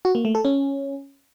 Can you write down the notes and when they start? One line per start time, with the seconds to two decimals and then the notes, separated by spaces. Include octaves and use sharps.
0.05 F#4
0.15 A#3
0.25 A3
0.35 A4
0.45 C#4